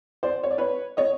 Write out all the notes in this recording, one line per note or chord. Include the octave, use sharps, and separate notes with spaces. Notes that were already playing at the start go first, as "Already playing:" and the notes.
C5 D5
C#5
D5
B4 C#5
C#5 D#5